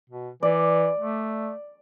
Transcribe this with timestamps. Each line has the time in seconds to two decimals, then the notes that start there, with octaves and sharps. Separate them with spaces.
0.09 B2
0.43 E3 D5
0.98 A3